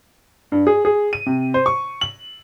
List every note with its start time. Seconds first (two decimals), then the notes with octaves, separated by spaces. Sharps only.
0.52 G2
0.67 G#4
0.85 G#4
1.13 D#7
1.26 C3
1.54 C5
1.66 C#6
2.01 F#7